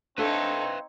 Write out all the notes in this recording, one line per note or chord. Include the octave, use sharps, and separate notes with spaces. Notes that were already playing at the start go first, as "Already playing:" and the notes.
C4 D4 D#4 A4 B4 C#5 E5 F5